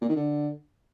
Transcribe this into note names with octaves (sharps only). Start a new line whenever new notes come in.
A#2
D#3
D3